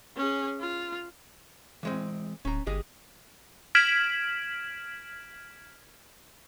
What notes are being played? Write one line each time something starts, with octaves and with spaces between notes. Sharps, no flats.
C#4 G#4
F4
E3 G#3 C4
D1 C#4 A#5
G1 G4 G#4 D#5
F6 G#6 B6 D7 E7 F#7